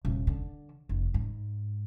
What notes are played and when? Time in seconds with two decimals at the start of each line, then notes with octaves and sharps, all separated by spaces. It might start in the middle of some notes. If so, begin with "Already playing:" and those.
0.05 D#1
0.27 D3
0.89 F1
1.14 G#2